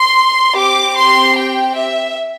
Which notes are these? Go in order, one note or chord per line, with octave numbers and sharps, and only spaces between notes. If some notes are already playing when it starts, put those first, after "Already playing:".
Already playing: C6
C4 G4 D6
C6
G5
E5